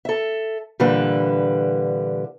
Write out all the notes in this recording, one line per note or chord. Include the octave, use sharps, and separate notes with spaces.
A4 E5
A#2 D3 E3 G3 B4